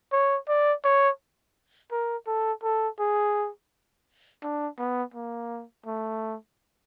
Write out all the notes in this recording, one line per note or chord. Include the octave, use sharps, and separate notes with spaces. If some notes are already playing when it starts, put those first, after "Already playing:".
C#5
D5
C#5
A#4
A4
A4
G#4
D4
B3
A#3
A3